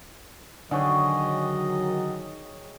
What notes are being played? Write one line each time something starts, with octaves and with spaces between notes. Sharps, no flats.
D3 D#3 F#3 G#4 C#5 D#5 G5